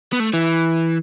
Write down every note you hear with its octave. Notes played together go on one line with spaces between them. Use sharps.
B3
A3
E3